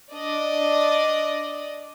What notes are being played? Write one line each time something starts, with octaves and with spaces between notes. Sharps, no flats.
D4 D5 D#5